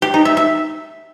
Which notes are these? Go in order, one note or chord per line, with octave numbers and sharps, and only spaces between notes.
G4
D#4
E5
E5